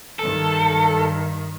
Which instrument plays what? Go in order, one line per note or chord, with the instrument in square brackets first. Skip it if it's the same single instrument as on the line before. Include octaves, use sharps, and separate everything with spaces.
[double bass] G2 D#3 [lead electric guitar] A4